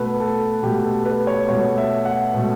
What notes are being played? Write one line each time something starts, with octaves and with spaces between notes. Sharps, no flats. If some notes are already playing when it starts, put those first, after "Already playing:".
Already playing: B2 A3 B4
A4
B2 A3 G4
A4
B4
C#5
B2 A3 C#5
E5
F#5
B2 A3